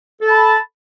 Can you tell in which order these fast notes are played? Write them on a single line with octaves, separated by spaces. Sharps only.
A4 A5 B5